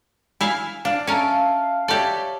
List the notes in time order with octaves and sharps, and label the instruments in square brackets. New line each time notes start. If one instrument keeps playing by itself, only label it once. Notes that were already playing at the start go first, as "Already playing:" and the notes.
[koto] E4 E5 F5 [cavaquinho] G#5
[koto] D4 [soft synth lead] F5
[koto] C#4 A#4 [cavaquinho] A4 E5 A5
[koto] G4 D5 [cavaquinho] A4 C#5 E5